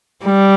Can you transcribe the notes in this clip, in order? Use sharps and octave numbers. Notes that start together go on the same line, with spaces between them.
G3